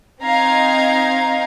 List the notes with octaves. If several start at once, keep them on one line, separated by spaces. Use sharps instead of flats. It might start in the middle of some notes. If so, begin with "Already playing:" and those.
C4 D#4 F5 A#5 G#6